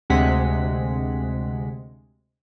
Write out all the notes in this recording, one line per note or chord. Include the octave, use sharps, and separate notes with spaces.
D2 C3 G#3 F#5 B6